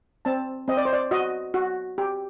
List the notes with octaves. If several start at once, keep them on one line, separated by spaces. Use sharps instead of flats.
C4 A5
C4 D#5
D5
C5
D5
F#4 D#5
F#4
G4